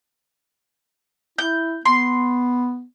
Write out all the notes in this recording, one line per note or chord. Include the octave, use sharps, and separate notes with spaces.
E4 G6
B3 C6